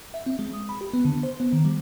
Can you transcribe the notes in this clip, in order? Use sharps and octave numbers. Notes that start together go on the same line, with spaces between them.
E5
C4
G#3
D#6
B5
G4
B3
D3
C5
B3
D#3
G3